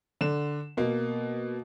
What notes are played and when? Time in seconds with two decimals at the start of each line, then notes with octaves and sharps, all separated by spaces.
0.21 D3 E7
0.77 B2 A#3